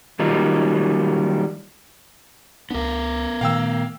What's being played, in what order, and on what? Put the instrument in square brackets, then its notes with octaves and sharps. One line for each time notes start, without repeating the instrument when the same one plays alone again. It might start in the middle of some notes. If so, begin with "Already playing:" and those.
[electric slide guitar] D#3 F#3 G3 A#3 D#4 F4
[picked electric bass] C#2 D4 [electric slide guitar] B3 A#4
[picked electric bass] A#2 D#3 A3 [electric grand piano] F5 G5 E6